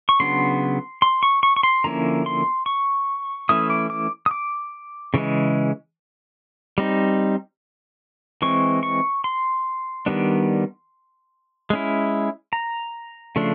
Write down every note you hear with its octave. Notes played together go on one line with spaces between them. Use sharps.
C#6
C#3 F#3 B3 D4 C6
C6
C#6
C#6
C#6
C6
D3 F3 A#3 C#4 E4 A#5
C6
C#6
E3 A3 C#4 E4 D#6
D6
D6
D#6
D6
C#3 E3 G#3
G3 C4 D#4
E3 G#3 C4 C#6
C#6
C6
D#3 G3 B3 D4
G#3 C#4 E4
A#5
C#3 F3 A3 D4